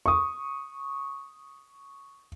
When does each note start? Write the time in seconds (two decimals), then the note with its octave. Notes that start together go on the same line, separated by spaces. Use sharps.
0.06 C#6 D#6